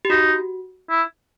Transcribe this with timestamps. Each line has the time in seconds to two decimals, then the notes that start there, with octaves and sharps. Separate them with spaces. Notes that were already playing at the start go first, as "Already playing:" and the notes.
0.05 G4
0.10 D#4 F#4
0.90 E4